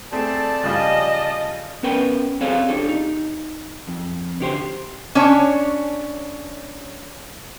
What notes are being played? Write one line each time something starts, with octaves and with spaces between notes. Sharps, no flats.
A3 C4 G#4 D5 A5
C#3 F3 G3 D#5
B3 C#4 A#4 B4 G5
C4 G#4 A4 C5 C#5 F5
D4 G4 A4
D#4
F2
D3 G4 C5
C#4 D4 C#5